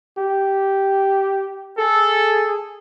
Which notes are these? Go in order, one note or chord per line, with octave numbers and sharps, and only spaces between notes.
G4
G#4 A4